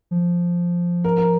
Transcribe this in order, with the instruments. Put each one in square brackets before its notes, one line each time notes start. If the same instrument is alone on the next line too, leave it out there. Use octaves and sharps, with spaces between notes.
[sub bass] F3
[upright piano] A#4
A#4